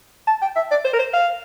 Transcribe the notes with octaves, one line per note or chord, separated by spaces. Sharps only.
A5
G5
E5
D5
C5
A#4
C5
F5